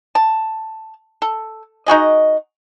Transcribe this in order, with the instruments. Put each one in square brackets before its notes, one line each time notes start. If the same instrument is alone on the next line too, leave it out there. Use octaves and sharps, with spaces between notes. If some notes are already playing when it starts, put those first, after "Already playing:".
[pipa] A5
A4
D#4 F#4 G#4 D#5